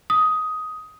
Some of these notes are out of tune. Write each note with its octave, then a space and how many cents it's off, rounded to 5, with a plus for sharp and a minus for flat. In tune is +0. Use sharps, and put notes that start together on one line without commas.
D#6 +10